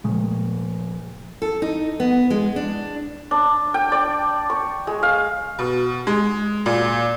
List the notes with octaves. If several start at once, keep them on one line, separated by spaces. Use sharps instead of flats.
A#2 C#3 F3 G#3 A3
A4
D#4
B3
G#3
D4
D4
G5
D5
C#6
G#3
F5
B2
G#3
A#2